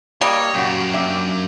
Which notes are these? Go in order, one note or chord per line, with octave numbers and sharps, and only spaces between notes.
G3 A#3 C#5 D#5
F#2 A#2 F#4 G5
A#3 D4 E5